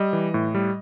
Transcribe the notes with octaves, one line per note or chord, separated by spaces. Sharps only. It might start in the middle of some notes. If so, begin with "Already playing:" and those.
Already playing: G3 D#5
E3
A2
G3